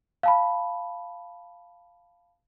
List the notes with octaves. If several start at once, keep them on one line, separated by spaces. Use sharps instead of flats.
F5 A5 B5